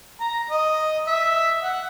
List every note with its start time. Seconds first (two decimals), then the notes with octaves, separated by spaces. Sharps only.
0.21 A#5
0.50 D#5
1.08 E5
1.63 F#5